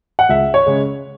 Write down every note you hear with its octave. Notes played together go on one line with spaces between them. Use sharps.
F#5
C#2 E5
C#5
C#3 G#3